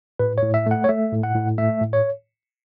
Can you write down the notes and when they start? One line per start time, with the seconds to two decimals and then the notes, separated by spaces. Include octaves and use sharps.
0.19 A2 B4
0.38 A2 C#5
0.54 E5
0.66 A3 F#5
0.84 C#5
0.89 A3 E5
1.12 A2
1.23 F#5
1.35 A2
1.58 A3 E5
1.81 A2
1.93 C#5